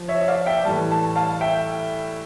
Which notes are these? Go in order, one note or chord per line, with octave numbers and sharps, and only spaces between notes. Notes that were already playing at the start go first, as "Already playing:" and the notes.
Already playing: F3
C#5 E5
E5
D5 F5
E5 G5
A2 E3 G3 A5
A5
F5 A5
E5 G5